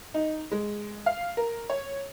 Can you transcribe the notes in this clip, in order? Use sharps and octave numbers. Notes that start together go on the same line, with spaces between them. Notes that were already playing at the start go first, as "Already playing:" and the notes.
D#4
G#3
F5
A#4
C#5